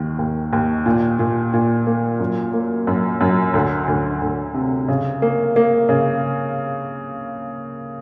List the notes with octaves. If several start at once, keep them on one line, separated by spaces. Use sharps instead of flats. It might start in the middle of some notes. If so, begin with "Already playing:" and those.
Already playing: D#2 D#3
D#2
D#2
A#2
A#2
A#2
A#3
F#2
A#3
F#2
F#2
D2
D2
D2
C3
C#3
A#3
A#3
C#3